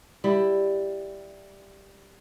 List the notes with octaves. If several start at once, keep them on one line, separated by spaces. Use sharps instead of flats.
G3 E4